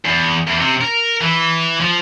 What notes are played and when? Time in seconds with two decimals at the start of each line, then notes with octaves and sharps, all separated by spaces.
0.05 E2
0.47 E2
0.60 C3
0.81 A#4
1.21 E3
1.80 F3